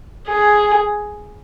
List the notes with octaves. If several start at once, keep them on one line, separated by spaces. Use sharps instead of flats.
G#4